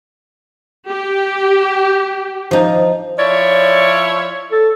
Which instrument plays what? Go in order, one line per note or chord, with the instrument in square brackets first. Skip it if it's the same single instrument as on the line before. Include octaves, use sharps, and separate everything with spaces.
[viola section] G4
[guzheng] F3 D#4
[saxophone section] F3 E4 C#5 [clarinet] D5
[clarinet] A4